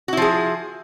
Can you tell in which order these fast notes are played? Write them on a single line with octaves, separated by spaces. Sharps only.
F#4 E4 F3 G#4